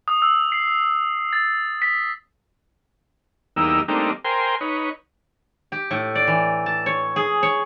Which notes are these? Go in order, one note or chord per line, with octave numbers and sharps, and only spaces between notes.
D#6
E6
C7
A6
B6
E2 G3 A#3 D#4 E6
G3 A3 A#3 C4 D4 D#4
A#4 C5 G5 G#5 C6
D#4 B4 C#5
G4
A2
D5
E3
A5
C#5
G#4
C#5